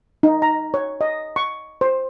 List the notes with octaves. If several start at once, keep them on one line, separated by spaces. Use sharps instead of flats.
D#4
A#5
C#5
D#5
C#6
C5